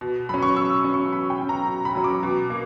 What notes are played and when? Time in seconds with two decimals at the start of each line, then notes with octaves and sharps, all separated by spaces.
0.01 B2
0.29 F#3 C#4 B5
0.42 C#6
0.57 B2 E6
0.84 F#3 C#4
0.94 C#6
1.12 B2 B5
1.30 G5
1.39 F#3 C#4
1.49 A#5
1.67 B2
1.85 B5
1.95 F#3 C#4
2.04 D6
2.23 B2
2.50 A#3